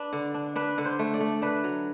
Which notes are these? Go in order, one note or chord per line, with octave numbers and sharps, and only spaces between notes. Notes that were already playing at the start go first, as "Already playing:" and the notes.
Already playing: D4 B4
D3
D4
D4 B4
D3
C5
A3
D5
A3
D4 B4
F#3